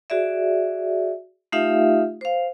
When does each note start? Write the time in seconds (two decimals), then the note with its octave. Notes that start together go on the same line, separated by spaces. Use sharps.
0.10 F#4 G#4 D5 E5
1.52 A3 D#4 F4 G4 E5 F5
2.21 C5 F5